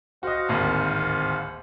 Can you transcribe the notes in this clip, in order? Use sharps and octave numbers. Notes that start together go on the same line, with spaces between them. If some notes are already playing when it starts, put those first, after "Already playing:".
F#4 C5 D#5 F5 F#5
D1 G#1 D#2